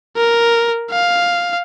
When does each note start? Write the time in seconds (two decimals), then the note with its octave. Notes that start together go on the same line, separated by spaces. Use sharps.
0.17 A#4
0.91 F5